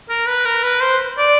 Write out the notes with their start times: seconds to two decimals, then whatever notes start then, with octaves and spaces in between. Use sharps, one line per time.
0.09 A#4
0.26 B4
0.45 A#4
0.63 B4
0.81 C5
1.18 D5